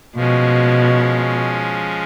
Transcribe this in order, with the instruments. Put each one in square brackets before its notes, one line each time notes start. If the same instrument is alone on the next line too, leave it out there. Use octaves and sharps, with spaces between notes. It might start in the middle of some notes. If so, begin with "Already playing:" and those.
[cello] B2 [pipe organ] F3 G#3 C#4